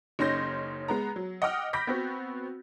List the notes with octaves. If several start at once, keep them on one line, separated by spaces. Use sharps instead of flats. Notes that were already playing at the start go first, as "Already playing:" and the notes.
F#1 C#4 D#4 C6 G6 A#6
G#3 B3 A#5
F#3
D#5 F#5 G5 D6 F6
B5 D6 G6 A#6 B6
B3 C4 F#4